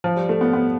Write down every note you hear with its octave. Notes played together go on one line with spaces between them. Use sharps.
F3
G3
A3
B3
B3